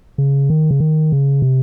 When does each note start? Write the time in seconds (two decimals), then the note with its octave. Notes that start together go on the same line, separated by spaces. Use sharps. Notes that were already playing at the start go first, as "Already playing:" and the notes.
0.18 C#3
0.50 D#3
0.71 C#3
0.80 D#3
1.12 C#3
1.42 C3